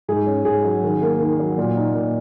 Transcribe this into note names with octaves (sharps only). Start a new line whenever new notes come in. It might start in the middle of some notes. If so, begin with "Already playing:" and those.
G#2 G#4
C#4
G#2 G#4
F#3
D#3
A#3
D#3
F#3
A#2
D#4
A#2